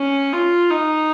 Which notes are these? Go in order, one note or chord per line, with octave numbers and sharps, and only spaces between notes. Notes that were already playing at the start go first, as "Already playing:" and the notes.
Already playing: C#4
F4
D#4